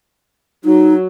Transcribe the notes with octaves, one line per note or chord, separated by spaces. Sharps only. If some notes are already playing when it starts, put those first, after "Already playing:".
F#3 D#4